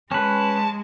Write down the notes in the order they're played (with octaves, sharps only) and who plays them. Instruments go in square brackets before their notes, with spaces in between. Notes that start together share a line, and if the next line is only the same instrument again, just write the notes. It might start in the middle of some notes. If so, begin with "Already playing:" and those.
[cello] G#3 [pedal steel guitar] C#4 B4 [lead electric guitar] A5